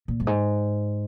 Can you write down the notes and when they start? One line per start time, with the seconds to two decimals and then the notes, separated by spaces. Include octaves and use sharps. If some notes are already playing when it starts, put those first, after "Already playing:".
0.08 A#2
0.20 G2
0.27 G#2